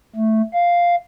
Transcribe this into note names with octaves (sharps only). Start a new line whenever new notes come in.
A3
F5